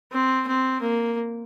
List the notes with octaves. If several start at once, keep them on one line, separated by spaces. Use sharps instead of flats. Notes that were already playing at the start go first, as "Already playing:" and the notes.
C4
C4
A#3